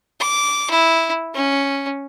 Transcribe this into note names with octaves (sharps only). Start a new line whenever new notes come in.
D6
E4
C#4